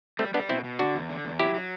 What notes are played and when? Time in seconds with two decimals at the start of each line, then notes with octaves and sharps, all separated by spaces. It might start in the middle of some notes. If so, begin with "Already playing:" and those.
0.19 G3 A3 C4
0.34 G3 B3 D4
0.49 B2 C4 E4
0.64 B2
0.79 D3 D4 F#4
0.95 E2
1.09 D3
1.25 E2
1.39 F#3 E4 G4
1.54 F#3